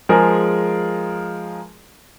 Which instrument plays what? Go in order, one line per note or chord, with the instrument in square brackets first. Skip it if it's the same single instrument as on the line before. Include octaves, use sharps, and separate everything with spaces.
[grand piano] F3 G#3 G#4 A#4